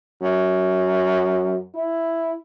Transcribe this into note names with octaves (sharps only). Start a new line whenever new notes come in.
F#2
E4